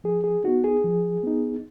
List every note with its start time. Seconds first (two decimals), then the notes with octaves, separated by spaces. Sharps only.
0.04 F3 G#4
0.24 G#4
0.44 B3 D#4 F#4
0.64 G#4
0.84 F3
1.23 B3 D#4